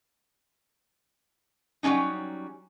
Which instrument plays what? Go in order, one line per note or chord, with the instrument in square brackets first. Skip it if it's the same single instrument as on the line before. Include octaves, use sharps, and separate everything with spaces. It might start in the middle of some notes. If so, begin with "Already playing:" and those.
[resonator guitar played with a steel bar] F#3 G3 A3 C#4 D#4